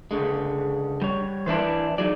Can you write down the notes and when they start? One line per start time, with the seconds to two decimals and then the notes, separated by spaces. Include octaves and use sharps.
0.11 C#2 D3 G#3
1.02 G3 C#5
1.46 E3 D4 E4 B4 C5
1.98 F#3 D#4 G#4 D5